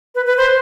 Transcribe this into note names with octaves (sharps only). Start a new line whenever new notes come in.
B4
B4
C5